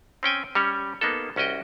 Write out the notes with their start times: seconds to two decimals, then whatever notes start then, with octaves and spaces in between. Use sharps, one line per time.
0.23 C4 C#4 G5 G#5
0.55 G3 C#4 C#5
1.01 A#3 B3 D#4 A4
1.36 C2 C#4 F#4 D#5 G5